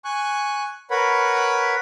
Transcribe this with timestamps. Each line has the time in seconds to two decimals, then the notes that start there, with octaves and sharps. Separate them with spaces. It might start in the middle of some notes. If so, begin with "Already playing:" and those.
0.05 G#5 C#6 F#6
0.90 A#4 B4 C#5 F#5 B5